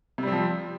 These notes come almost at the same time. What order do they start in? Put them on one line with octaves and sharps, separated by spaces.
C3 G3 C4 F3